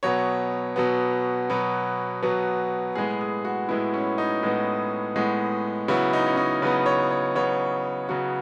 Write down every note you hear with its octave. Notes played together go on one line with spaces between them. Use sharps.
B2 F#3 B3 C#5
B2 F#3 B3
B2 F#3 B3 B4
B2 F#3 B3 B4
A2 G#3 B3 G#4
G#4
F#4
A2 G#3 B3 E4
C#4
D#4
A2 G#3 B3
A2 G#3 B3
C#3 F#3 B3 E4
D#4
C#4
D#4
C#3 F#3 B3 B4
C#5
C#5
C#3 F#3 B3 C#5
C#3 F#3 B3 F#4